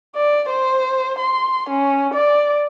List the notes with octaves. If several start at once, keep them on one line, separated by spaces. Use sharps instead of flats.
D5
C5
C6
C#4
D5